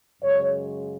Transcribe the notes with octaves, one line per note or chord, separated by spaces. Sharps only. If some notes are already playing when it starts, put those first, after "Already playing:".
F#2 C#3 G#3 C#5